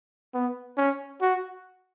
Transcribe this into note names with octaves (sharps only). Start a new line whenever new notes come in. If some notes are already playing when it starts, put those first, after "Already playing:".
B3
C#4
F#4